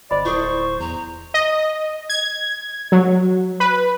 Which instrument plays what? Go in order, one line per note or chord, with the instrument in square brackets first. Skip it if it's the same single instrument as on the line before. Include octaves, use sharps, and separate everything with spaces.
[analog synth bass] G1 [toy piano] C5 D#5 B5 [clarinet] D5
[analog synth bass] D1 [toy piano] E4 A4 [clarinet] C5 [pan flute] C#6
[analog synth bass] E2 [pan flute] A#5
[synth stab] D#5
G#6
F#3
B4